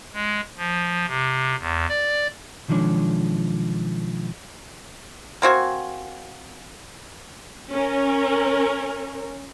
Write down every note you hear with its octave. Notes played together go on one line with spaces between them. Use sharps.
G#3
F3
C3
E2
D5
B1 D#3 F3 G#3 D4 C#5
A#3 C4 F#4 G#5
C#4 A#4